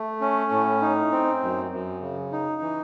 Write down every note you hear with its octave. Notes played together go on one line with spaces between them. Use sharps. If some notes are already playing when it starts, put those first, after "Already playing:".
Already playing: A3
C#4
A2
D#4
C4
F#2
F#2
C#3
D#4
E3